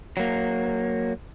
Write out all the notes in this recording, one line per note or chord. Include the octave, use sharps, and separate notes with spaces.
F#3 A#3